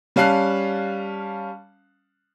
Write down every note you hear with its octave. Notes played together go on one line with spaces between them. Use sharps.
G3 C#4 F5 A5 F#6 C7